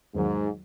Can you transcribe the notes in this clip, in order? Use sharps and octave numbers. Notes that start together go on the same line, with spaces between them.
E2 G#2 D#3 F#3